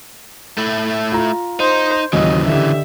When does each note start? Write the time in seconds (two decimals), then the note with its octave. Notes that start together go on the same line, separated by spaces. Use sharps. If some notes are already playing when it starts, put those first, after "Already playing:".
0.58 A3 E4
1.12 F4 A#5
1.60 D#4 C5
2.13 D#2 C#3 E3 F#3 D#5
2.48 D3 G4 E5